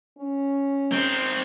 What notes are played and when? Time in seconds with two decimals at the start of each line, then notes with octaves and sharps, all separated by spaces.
0.18 C#4
0.92 D#3 C4